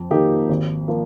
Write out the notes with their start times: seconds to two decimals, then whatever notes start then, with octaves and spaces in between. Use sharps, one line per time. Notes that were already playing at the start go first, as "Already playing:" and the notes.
Already playing: F2
0.10 D#3 A#3 D#4 G4
0.49 G#1
0.88 F3 A#3 F4